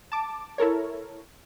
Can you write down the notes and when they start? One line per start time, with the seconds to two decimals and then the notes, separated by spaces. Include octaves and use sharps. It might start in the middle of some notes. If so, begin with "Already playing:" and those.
0.12 A5 D6
0.58 E4 A4 A#4 C#5